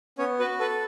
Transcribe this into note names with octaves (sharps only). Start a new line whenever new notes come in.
B3 C#4 C#5
F#4 B4
A4 B4